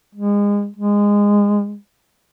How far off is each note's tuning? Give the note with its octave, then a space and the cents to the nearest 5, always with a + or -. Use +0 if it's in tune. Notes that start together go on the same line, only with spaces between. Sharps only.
G#3 -30
G#3 -20